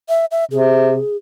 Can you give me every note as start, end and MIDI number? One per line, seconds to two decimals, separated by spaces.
0.09 0.25 76
0.31 0.45 76
0.52 0.99 48
0.52 1.17 68